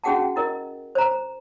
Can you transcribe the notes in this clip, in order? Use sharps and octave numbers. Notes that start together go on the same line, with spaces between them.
C#4 F#4 G#4 F#5 G5 A5
E4 A#4 D#5
C5 A#5